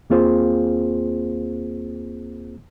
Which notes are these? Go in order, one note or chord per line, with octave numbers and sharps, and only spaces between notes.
D#2 A#3 C4 F4 G#4 C5